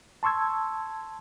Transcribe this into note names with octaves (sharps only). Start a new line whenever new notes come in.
A5 C6 C#6 E6 G#6